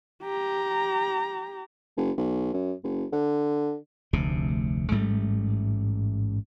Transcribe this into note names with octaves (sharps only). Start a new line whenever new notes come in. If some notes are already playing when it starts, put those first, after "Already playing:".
G4 A#5
F#1
B1
F#2
F#1
D3
F1 D2 C3
A1 G#2 G3 A3